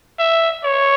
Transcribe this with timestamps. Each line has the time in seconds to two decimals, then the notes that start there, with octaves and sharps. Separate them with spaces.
0.19 E5
0.64 C#5